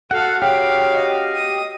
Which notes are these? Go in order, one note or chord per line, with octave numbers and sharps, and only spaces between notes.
F#4 A4 F5 F#5
C#3 F#4 G4 F5 G5
D#5
D#6